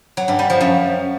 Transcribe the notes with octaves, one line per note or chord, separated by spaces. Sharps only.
F#3
G2
G3
F3
F#2